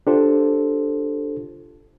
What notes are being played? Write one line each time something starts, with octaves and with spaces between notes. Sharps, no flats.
D4 F4 G4 A4 C5